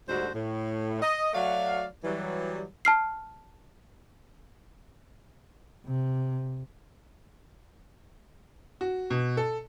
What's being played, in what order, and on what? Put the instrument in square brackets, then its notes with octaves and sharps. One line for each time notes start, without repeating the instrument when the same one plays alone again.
[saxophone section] D2 G#2 D3 G3 F#4 C5
A2
D#5
F#3 A3 F#4 D5 F5
E3 F#3 G3
[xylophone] A5 F6 C7
[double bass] C3
[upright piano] F#4
B2
A4